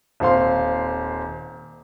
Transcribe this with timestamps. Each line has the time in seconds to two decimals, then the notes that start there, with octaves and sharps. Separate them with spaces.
0.20 D#1 C4 F5 C6